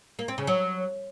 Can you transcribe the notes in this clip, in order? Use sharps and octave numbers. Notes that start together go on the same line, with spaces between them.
A#3
C4
C#3
F#3